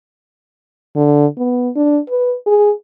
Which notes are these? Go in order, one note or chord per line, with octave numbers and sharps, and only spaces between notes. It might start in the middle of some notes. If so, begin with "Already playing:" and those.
D3
B3
D4
B4
G#4